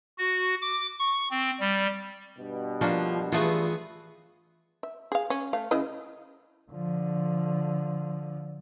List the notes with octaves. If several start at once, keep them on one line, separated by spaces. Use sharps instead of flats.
F#4
D6
C#6
C4
G3
G2 B2
F3 A#3 D4 F#4
G2 E3 A3 B3 F4 F#4 G#4
E5
G#4 F5
C#4
A3 F5
C#3 E4 D#5
D3 F3